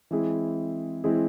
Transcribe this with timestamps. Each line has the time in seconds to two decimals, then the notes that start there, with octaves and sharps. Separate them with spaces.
0.11 E3 G#3 C4 E4 G#4
1.04 E3 G#3 C4 E4 G#4